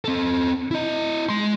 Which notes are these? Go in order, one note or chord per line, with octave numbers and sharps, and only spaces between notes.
C4 A4
E4 D#5
G#3 C6